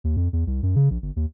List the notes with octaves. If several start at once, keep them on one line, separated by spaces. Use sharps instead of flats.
D#2
F2
E2
C2
F#2
C#3
A#1
G1
D#2